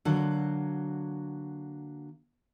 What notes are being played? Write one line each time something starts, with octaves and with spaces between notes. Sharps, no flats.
D3 F#3 A#3